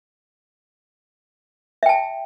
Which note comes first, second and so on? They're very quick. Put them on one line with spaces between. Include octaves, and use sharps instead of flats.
E5 G5 A5